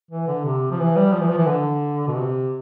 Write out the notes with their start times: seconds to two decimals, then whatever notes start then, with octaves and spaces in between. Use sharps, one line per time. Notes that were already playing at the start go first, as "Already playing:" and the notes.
0.11 E3
0.28 D3
0.45 C3
0.71 F3
0.79 E3
0.96 G3
1.13 F3
1.20 E3
1.28 F3
1.37 E3
1.47 D3
2.08 B2
2.14 C3